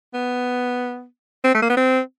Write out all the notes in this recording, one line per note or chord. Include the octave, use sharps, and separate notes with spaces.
B3
C4
A3
A#3
B3
C4